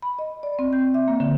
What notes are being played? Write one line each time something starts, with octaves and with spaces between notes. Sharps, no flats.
B5
D#5
D5
C4
G6
E5
A#3
D3